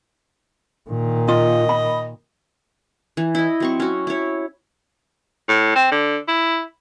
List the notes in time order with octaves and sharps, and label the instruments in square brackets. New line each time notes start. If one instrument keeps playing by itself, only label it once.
[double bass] A#2 D#3
[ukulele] F4 [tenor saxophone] D#5
[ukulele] B5
[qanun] E3
E4 D#5
F#3 C4 C#6
C#4 F#4
E4 C#5
[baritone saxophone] A2
C4
D3
E4